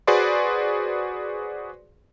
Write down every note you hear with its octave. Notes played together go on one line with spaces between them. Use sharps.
F#4 G#4 B4 C5 D5 C6